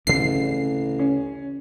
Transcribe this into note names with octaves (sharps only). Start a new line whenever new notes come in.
A1 D2 C#3 C4 C7
C#4